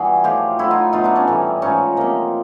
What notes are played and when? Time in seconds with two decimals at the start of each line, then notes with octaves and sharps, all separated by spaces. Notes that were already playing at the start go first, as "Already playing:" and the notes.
Already playing: E3 G3 F#4 G#4
0.24 A2 F3 F4 G4
0.59 A2 F#3 E4 F#4
0.71 D#4 F4
0.93 B2 F#3 D#4 F4
1.04 D4 E4
1.16 C#4 D#4
1.27 A2 E3 G3
1.62 G#2 F3 C#4 D#4
1.97 C3 F3 A#3